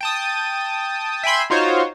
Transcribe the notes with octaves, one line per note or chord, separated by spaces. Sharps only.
G5 A5 D#6
E5 G5 G#5 B5 C6
D#4 F4 F#4 C5 C#5